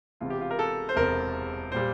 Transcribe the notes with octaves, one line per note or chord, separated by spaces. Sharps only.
E1 E2 C3 F4
G4
F4
A#4
A4
C5
E1 E2 C3 A#4
A#2 G3 C5